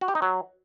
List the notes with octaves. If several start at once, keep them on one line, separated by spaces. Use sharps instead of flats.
F#4
G4
D#4
F#3